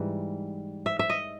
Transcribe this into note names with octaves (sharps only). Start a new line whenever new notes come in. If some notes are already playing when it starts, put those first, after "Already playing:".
Already playing: G#2 E3 G3
E5
E5
D#5